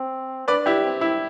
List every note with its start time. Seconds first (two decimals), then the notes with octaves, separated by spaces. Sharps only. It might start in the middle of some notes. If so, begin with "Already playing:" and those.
Already playing: C4
0.48 D4 B4 D5
0.66 E4 G4
0.84 C4
1.01 E4